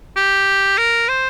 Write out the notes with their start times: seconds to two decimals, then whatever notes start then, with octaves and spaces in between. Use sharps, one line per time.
0.16 G4
0.78 A#4
1.09 C5